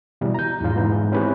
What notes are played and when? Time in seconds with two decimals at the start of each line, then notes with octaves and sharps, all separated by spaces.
0.21 B2 E3 G3
0.34 A#5 G6
0.61 E2 G#2 F4
0.76 G#2 E3 B3
1.12 C4 C#4 E4 G4 B4 C#5